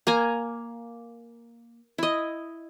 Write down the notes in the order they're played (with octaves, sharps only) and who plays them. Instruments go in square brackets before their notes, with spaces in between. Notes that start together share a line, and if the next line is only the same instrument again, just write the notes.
[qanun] A#3 G#5 A#5
E4 D#5